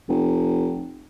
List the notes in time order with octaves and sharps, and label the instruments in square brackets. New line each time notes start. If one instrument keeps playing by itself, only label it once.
[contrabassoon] F1